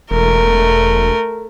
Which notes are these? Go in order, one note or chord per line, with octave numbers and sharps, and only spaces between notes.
E1 A3 A#4